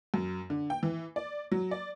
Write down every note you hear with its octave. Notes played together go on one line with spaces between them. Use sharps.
F#2
D3
G5
E3
D5
F#3
D5